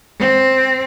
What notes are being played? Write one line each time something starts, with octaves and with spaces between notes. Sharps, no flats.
C4